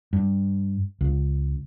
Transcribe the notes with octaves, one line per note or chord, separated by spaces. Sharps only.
G2
C#2